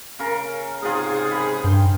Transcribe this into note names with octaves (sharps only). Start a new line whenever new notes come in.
C#3 A#4
G#2 C3 F4 G#4 D#5
B5
G2 G5